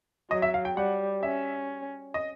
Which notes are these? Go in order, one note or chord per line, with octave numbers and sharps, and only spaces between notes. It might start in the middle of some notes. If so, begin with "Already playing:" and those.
F#3 D#5
E5
F5
G5
G3 F#5
C#4 E5
D#5